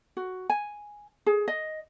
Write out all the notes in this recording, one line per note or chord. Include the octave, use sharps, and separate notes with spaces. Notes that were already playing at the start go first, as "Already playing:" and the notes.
F#4
G#5
G#4
D#5